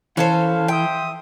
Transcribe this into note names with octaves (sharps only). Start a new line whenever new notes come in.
E3 C#4 A4 C5 F5
E5 G5 C6 D#6